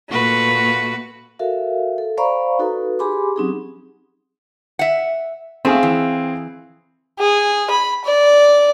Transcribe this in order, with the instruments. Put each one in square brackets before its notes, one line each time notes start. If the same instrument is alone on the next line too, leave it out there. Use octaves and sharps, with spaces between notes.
[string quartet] A#2 A3 F#4 [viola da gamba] B4
[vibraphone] F#4 A4 A#4 E5 F5
A4
C5 D5 F5 A#5 B5 C#6
D#4 F#4 A4 B4
G4 G#4 G#5 B5 C6 D6
F#3 C4 C#4 D#4 G4 G#4
[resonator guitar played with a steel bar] E5 F#5
[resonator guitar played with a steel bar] A3 [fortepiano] C4 G#4 F5
[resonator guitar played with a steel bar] E3
[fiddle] G#4
B5
D5